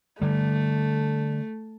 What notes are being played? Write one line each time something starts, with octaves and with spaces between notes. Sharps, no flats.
D3 G3 A3